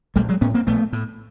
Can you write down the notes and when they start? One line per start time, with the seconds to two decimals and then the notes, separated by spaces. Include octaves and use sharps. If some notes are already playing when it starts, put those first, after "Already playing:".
0.16 A#1 G3 A3
0.29 F#3 G#3
0.41 A2 B3 C#4
0.54 A#3 C4
0.67 A#1 A3 B3
0.93 A2